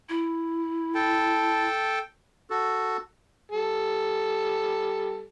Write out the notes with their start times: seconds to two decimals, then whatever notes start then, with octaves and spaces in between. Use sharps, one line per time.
0.09 E4
0.95 A4 G5 A5
2.50 F#4 A4
3.52 G3 A4